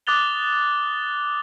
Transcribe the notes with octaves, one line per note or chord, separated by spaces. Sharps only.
D6 D#6 F#6 A6 F7 G7